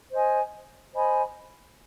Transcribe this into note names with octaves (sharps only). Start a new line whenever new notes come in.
C5 D#5 G#5
C5 D#5 G#5 B5